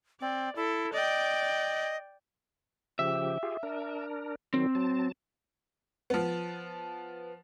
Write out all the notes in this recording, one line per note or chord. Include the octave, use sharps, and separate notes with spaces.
C4 D5
E4 A4
D5 D#5 G5
C#3 F3 G4 E5
F4 G4 G#4
D4 A#4
D#3 F#3 C4
F#3 A5
F3 B3